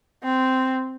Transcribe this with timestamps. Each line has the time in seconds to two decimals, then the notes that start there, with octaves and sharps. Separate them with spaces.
0.23 C4